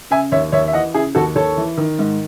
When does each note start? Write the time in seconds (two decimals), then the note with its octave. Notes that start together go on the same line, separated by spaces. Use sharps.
0.10 C#3 E5 G#5
0.32 D#2 C#5 E5
0.52 D#2 C#5 E5
0.67 E5
0.73 E3 D#5 F#5
0.94 C#3 E4 G#4
1.15 D#2 F#4 A4
1.36 D#2 A4 C#5
1.57 E3
1.77 D#3
1.99 G#2